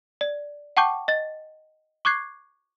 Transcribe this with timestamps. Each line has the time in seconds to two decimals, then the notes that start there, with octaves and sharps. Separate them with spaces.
0.21 D5
0.77 F#5 G5 A5 C#6 D6 G6
1.08 D#5 A6
2.05 C#6 D6 F#6 G#6 C7